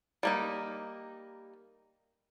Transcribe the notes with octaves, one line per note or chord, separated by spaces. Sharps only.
G3 A#3 D#4